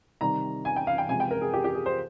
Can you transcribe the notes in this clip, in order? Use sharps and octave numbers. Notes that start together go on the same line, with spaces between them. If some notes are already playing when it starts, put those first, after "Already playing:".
C3 D#3 G3 A#5
G#5
G5
F5
G5
C3 F3 G#3 G#5
G5
A#4
G#4
G4
G4
G#4
C5